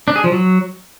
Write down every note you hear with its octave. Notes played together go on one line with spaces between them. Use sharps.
D4
G#4
F3
F#3